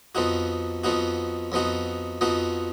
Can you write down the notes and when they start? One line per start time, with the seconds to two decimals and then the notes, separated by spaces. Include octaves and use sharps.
0.15 F2 F3 B3 D#4 F#4
0.84 F2 F3 B3 D#4 F#4
1.52 F2 F3 B3 D#4 F#4
2.21 F2 F3 B3 D#4 F#4